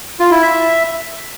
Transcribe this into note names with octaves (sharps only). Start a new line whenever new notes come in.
F4
E4
E5